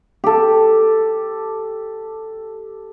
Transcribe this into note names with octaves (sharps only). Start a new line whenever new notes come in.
G4 A4